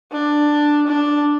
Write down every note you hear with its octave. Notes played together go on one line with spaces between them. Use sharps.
D4
D4